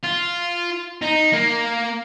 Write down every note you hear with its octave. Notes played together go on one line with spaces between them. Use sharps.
F4
D#4
A#3